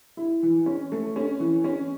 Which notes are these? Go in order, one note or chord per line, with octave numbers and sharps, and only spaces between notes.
E4
E3
C#4
A3
C#4
E3
C#4